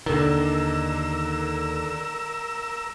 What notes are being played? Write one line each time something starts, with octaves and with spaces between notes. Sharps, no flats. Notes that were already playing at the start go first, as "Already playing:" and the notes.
D#2 D3 D#3 D4 A#4 E6